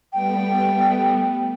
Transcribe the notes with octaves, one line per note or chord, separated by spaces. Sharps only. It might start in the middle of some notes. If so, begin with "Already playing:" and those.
G3 A3 B3 G5